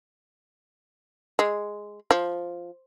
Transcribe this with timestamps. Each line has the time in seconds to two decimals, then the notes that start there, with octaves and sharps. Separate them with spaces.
1.39 G#3
2.11 F3